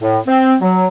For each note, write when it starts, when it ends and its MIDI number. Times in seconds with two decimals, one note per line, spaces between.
0.01 0.18 45
0.27 0.55 60
0.61 0.87 54